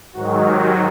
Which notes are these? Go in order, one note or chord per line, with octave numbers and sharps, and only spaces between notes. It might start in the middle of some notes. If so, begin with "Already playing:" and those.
G#2 D#3 F#3 F#4
G4